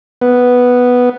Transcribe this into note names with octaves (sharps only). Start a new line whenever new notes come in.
B3